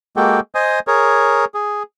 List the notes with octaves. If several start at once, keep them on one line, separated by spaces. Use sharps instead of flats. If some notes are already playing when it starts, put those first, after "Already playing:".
G#3 A#3 F#4 G4 A4 G5
C5 D#5 G#5 D#6
G#4 A#4 C#5
G#4